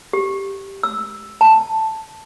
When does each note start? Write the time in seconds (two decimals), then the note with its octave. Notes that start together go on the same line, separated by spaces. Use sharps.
0.13 G4
0.83 E6
1.41 A5